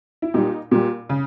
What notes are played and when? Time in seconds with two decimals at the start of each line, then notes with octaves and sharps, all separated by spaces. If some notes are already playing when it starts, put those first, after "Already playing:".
0.22 E4
0.34 A#2 G3 D#4
0.71 A#2 G3
1.09 C#3